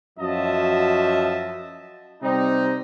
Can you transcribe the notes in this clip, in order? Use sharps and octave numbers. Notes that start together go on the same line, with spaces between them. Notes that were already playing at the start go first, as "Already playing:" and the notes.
F#2 F3 F#4 D#5 E5 A5
C3 G3 C4 D#4